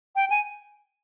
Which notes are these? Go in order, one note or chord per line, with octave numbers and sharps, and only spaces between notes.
G5
G#5